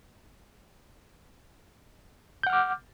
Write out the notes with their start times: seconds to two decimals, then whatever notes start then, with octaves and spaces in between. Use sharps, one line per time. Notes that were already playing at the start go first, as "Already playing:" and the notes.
2.43 G6
2.47 F#5
2.50 F6
2.53 D6